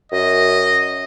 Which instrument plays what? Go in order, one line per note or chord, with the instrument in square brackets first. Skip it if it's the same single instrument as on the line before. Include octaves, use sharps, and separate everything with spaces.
[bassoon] F#2 [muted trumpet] D#5